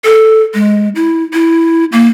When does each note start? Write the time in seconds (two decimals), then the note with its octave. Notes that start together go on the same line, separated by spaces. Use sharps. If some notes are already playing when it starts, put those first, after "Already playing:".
0.05 A4
0.54 G#3
0.95 E4
1.33 E4
1.92 A#3